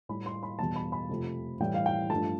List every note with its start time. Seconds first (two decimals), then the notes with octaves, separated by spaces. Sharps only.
0.09 A2 G3 B5
0.26 C6
0.43 B5
0.59 E2 B2 G3 A5
0.76 B5
0.92 B5
1.10 F2 C3 F3 A3
1.60 A2 E3 G3 G5
1.74 F5
1.86 G5
2.10 G2 F3 A3 A5